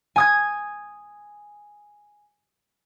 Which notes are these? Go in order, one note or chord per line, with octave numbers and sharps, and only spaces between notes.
G#5 D#6 G#6